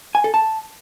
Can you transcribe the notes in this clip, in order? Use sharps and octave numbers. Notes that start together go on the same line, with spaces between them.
G#5
A4
A5